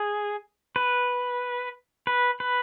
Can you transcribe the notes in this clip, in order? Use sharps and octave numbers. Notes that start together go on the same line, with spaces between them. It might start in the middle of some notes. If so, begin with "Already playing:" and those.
Already playing: G#4
B4
B4
B4